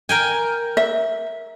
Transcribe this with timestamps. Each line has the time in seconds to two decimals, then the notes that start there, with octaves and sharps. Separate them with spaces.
0.09 A#4 G5 G#5
0.77 E5